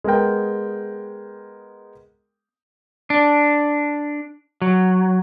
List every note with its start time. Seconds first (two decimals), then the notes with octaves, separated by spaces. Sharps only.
0.04 G#3 B3 A#4 G5
3.10 D4
4.62 F#3